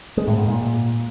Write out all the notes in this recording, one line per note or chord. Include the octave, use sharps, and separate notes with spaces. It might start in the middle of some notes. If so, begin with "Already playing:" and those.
G#3
A2
G#2
A#2